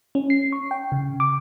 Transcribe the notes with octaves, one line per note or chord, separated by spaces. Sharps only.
C#4
C7
C#6
G5
C#3
D6